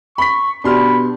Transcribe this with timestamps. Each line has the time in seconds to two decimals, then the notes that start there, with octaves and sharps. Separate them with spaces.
0.18 B5 C#6 B6
0.64 B2 D4 G4 B5 C6 F6